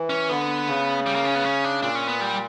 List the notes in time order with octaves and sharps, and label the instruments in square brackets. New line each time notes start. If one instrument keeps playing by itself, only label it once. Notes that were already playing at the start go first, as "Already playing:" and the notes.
Already playing: [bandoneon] E3
[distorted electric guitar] C#4
[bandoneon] D3 [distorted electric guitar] B3
[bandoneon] C#3
[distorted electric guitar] G3
A#3
C#4
B3
C#4
D4
[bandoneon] A#2 [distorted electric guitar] D4
[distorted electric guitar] C#4
B3
G3